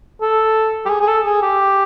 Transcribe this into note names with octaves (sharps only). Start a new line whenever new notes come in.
A4
G4
G#4
G#4
A4
G#4
G4